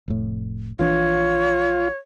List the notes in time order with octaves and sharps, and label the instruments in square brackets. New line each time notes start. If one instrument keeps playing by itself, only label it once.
[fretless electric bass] F1 A2
[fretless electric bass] A#1 E3 D4 [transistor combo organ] F4 [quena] C#5